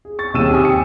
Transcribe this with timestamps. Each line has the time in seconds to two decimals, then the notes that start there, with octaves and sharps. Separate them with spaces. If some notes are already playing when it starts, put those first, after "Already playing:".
0.05 G#4
0.19 C#6 A6
0.34 D#2 C3 G#4 E6 D#7 E7
0.51 G4 G5 G#5 D#6
0.65 C#7